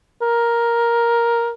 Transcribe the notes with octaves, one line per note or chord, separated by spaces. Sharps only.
A#4